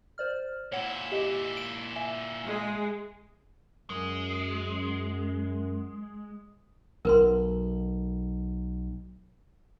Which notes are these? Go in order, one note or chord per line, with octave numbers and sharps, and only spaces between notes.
C5 D5 F6
A#2 E4 C#5 F#5
G4 D#5
D7
E5 G#5
G#3
F#2 G#3
B1 A#4 B4 C6